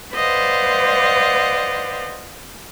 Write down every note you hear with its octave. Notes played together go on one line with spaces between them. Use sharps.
B4 C5 D5 D#5 F5 F#5